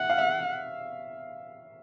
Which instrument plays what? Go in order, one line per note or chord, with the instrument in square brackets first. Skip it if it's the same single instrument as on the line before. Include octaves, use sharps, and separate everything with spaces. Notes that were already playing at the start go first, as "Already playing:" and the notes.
Already playing: [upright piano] E5 [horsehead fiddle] F#5
[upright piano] F5
E5